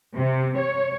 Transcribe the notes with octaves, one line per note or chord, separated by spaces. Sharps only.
C3
C#5